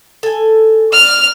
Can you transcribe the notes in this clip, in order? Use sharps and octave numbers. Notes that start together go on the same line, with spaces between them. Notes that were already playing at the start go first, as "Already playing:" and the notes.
A4 G#5
D5 F6